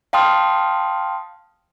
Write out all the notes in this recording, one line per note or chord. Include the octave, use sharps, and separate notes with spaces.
F5 G5 A5 C6 D#6 F6